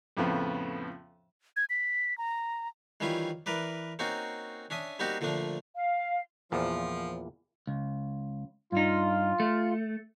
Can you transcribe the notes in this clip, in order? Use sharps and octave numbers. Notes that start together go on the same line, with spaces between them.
F2 A2 C#3 F3 B3
G#6
B6
A#5
D#3 E3 G3 C#4 E4 F4
E3 A#4 B4 D5
A#3 C4 C#4 D#4 F#4
C#4 D4 E5 D#6
G3 A#3 C4 D#4 F#4 G4
A#2 D3 F3 A3 D4
F5
E2 A#2 F3
C#2
G2 D#4 F4
A3